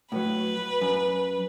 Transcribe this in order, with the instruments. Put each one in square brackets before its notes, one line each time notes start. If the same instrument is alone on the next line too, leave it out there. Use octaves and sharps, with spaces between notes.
[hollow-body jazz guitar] A2 F#3 [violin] B4
[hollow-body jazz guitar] F#2